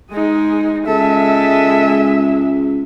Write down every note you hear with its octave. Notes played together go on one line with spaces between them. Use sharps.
G#3 D#4 G#4
C#2 G#3 A4 E5